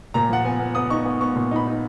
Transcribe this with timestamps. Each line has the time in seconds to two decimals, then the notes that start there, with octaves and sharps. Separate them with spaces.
0.14 A#2 A#5
0.29 F3 F#5
0.45 B3 G#5
0.60 B3
0.75 B3 D#6
0.90 D#4 C#6
1.05 B3
1.21 B3 C#6
1.36 A#2
1.51 D#4 B5
1.66 D#4